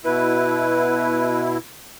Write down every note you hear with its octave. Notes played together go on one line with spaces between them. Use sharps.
B2 E4 B4